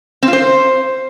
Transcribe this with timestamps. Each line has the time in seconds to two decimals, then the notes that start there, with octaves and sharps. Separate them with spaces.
0.23 C4
0.28 F4
0.33 C5